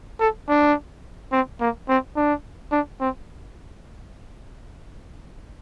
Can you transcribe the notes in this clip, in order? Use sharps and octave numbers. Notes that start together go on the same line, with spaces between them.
A4
D4
C4
A#3
C4
D4
D4
C4